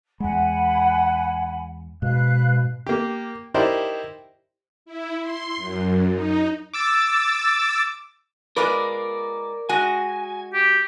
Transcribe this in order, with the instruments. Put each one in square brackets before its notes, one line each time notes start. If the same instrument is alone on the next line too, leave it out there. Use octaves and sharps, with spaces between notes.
[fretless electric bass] E2 G#3 [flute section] F#5 G#5 B5
[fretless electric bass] G#2 [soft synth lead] B2 [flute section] B4 F5 F#6
[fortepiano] A#3 G4
D#4 E4 G4 A#4 C5 D5
[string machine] E4
C6
F#2
D#4
[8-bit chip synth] D6 E6 A6
[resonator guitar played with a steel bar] G#3 F4 B4 [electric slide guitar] A#4 D5
[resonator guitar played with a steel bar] G#3 F#4 [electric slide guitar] G#5
[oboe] G4